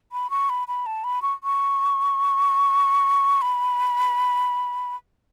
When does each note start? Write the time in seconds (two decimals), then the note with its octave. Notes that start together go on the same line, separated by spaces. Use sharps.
0.12 B5
0.30 C#6
0.49 B5
0.68 B5
0.86 A5
1.04 B5
1.22 C#6
1.44 C#6
3.42 B5